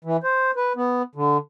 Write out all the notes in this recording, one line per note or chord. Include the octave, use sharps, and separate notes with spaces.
E3
C5
B4
B3
D3